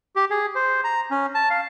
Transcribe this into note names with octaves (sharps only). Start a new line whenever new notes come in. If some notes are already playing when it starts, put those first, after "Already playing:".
G4
G#4
C5
A#5
C#4
A5
F5